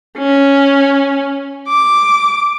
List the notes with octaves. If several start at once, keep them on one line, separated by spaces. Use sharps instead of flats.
C#4
D6